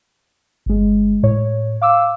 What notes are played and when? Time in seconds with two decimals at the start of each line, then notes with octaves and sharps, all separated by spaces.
0.66 G1 G#3
1.23 A2 C#5
1.82 F5 D6 E6